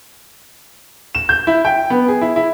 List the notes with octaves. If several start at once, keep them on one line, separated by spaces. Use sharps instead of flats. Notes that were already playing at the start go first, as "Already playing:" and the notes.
E7
G6
E4
G5
B3
G#4
E4
E4